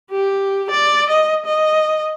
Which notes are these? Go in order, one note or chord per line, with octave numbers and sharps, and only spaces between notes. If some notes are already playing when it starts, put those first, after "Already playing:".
G4
D5
D#5
D#5